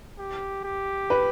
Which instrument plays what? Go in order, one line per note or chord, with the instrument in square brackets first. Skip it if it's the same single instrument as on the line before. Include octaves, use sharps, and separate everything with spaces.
[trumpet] G4
G4
[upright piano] B4